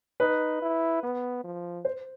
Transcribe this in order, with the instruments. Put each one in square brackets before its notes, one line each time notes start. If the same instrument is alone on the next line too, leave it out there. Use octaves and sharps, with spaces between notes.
[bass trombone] D#4 [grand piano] B4
[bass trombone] E4
B3
F3
[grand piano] C5